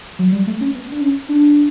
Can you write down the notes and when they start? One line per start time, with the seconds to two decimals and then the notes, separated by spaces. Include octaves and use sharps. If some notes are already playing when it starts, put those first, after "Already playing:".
0.19 F#3
0.32 G3
0.47 A3
0.61 C#4
0.75 B3
0.92 D4
1.01 C#4
1.29 D4